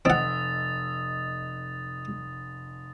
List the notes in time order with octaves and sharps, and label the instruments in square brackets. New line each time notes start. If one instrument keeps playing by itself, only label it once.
[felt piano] F1 D#5 E6 [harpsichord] C4 F#5 [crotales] D#6 A6